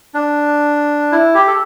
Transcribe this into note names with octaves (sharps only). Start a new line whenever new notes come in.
D4
E4
G4
A4